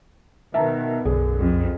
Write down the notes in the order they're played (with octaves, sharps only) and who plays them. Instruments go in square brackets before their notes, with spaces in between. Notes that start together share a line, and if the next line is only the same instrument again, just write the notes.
[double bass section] B2 D#3 B3 [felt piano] E5 A5 A#5
[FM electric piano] B1 [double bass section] F#2 D3 [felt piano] G#4
[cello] F2